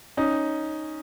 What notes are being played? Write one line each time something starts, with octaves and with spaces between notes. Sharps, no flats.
C#4 D#4